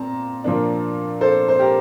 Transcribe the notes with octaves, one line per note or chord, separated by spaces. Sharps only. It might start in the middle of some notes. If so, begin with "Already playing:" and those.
Already playing: A#2 C4 A5 A#5
A#2 F3 A#3 D4
A4 C5
C5
G4 A#4